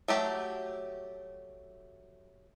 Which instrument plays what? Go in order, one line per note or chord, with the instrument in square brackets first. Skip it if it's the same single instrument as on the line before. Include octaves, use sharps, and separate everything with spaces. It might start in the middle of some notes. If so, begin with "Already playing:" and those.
[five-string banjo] F#3 A3 G4